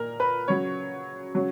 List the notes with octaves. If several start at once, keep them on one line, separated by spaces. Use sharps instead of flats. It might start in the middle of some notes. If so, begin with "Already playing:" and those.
Already playing: A#2 A#4
B4
C#3 F#3 C#5
C#3 F#3